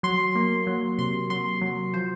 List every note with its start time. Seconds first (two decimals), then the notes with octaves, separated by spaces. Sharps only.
0.03 F#3 C6
0.35 A#3
0.67 F#3
0.98 C3 C6
1.30 F#3 C6
1.61 F#3
1.94 F3 C5